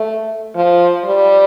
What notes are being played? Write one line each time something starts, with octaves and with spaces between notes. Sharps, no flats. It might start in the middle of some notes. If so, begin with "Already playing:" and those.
Already playing: A3
F3
G3